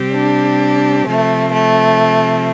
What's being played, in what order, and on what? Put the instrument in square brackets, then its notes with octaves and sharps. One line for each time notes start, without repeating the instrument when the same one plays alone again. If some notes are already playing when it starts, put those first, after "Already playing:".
Already playing: [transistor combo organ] C3 G3 C4 G4
[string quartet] D4
[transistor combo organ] C3 F3 C4 [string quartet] A3
[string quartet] A3